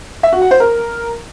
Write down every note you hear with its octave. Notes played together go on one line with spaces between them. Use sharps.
E5
F#4
F#5
C5
A#4